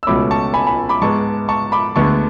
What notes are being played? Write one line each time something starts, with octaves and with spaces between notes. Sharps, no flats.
E6
C#2 B2 A3 C#4 B5 D6
A5 C#6
G#5 B5
G#5 B5
B5 D6
G#2 G#3 B3 A5 C#6
A5 C#6
B5 D6
D2 D3 G#3 B3 A5 C#6